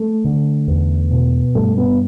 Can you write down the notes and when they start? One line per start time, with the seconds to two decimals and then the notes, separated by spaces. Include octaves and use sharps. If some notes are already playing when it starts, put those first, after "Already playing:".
Already playing: A3
0.24 D3
0.68 E2
1.11 B2
1.55 G2 A3
1.78 B3